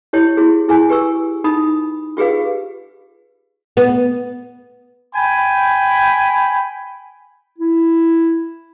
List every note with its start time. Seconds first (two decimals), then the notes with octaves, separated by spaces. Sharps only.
0.13 E4 G4 C#5
0.37 E4 F#4 G#4
0.68 E4 G#4 G#5
0.89 G4 B4 C#6 E6
1.44 D#4 B5 D#6
2.17 F4 G4 G#4 B4 F5
3.77 B3
5.14 G5 G#5 B5
7.58 E4